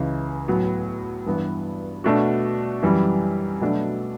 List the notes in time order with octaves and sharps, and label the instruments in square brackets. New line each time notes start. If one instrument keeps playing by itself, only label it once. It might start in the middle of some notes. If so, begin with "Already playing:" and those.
Already playing: [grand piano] C#2 C#3 E3
A2 F#3 B3
G2 E3 B3
B2 A3 D4 F#4
F#2 E3 G3
B2 F#3 A3 D4